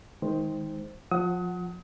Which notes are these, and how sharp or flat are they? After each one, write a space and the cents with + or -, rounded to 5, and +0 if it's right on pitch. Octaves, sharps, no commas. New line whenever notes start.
D#3 +20 G#3 +0 C5 +0
F3 +30 F#5 +0 D#6 +35